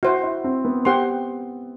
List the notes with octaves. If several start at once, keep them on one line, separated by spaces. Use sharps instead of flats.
E4 F#4 C5 F#5
E4
C4
B3
B3 G4 C5 F#5 C6